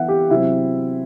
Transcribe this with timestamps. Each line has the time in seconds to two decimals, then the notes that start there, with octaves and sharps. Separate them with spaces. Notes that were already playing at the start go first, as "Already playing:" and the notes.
Already playing: E3 B3 E5 F#5
0.08 G4
0.30 C3 F#3 C4 E4